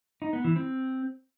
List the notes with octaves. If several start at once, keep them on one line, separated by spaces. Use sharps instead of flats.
D#4
B3
E3
C4